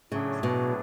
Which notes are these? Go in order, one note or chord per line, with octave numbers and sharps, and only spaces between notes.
A2 C#3 F#3 A3 D4 G#4
B2